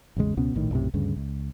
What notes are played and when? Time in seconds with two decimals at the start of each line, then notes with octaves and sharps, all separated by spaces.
0.16 A1 E2 C#3 G#3
0.37 C#2 B2 B3 C#4
0.55 A#1 A2 D#3
0.71 B1 F#2 A2 C3
0.94 D2 G2 C#3
1.16 C#2